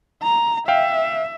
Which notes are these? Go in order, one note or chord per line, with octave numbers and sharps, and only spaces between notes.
A#5
E5 F5 G5